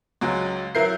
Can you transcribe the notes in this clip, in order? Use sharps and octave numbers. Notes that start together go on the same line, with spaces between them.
C#2 F#3 G#3
F#3 E4 A#4 G6 C7